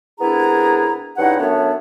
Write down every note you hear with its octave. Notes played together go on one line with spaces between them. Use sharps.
C2 B3 D4 E4 G#4 A#5
G2 C#3 D#4 E4 F#5
F#2 A3 B3 D4 C#5